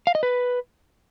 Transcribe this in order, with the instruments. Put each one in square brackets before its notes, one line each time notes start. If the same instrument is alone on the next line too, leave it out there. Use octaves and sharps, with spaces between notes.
[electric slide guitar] F5
D#5
B4